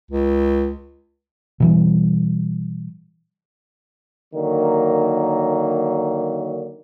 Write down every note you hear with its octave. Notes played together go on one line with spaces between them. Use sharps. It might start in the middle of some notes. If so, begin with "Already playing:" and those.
C#2
B2 E3 G3
D3 D#3 F#3 A#3